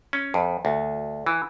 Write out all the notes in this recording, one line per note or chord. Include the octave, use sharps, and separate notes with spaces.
C#4
F2
D2
E3